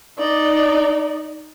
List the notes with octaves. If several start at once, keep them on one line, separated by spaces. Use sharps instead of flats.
D#4 D5